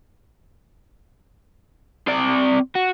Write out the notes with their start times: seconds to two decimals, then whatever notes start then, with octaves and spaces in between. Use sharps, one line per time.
2.07 C4 D5
2.75 F#4